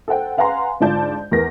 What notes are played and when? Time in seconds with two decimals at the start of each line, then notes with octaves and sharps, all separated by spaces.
0.08 A4 C5 F#5 G5
0.37 B4 F5 F#5 G#5 A#5 C6
0.80 G#2 D3 F4 D5 A5 G6
1.31 E2 A#4 B4 A#6